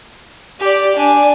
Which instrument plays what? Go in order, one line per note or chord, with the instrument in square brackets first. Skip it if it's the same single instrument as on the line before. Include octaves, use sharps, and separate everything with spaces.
[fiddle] G4 D5
D4 G#5